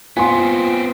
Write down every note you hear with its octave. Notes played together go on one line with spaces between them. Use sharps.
B3 C4 F4 G#5 C6